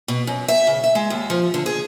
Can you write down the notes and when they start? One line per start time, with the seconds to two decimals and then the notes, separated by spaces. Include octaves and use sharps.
0.08 B2
0.27 F#2
0.48 E5
0.67 C#3
0.84 E5
0.95 G#3
1.10 D#2
1.30 F3
1.54 D3
1.66 G#4